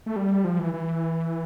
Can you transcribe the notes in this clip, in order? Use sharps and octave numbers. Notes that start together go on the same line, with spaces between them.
A3
G3
F3
E3
E3